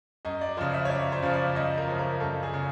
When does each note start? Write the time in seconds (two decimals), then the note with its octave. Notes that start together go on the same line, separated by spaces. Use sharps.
0.25 F#2 D#5
0.41 D5
0.57 C#3 F3 C5
0.74 E5
0.85 C#5
0.90 F#2 D5
1.12 C5
1.22 C#3 F3
1.34 D5
1.55 F#2 D#5
1.78 A#4
1.88 C#3 F3
1.99 A#4
2.20 F#2 A4
2.43 G#4
2.54 C#3